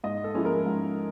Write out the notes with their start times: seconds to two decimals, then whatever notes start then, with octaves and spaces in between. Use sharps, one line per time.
0.04 G#2 D#5
0.24 A4
0.34 F3 G#3 C#4 E4
0.45 A#4
0.66 G#2